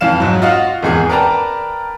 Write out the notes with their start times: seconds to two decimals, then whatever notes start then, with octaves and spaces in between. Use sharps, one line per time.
0.01 F2 E3 F5 E7
0.20 G#2 F#3
0.42 F4 F#4 D#5 F5
0.83 G#1 E2 G#4
1.09 A#4 B4 D5 G5 A5 A#5